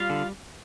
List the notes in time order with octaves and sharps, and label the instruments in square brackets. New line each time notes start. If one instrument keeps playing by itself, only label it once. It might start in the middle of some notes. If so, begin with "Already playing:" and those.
Already playing: [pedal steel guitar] G3 F4 F5
D3